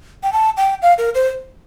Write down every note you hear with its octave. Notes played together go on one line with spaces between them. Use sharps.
G5
A5
G5
F5
A#4
C5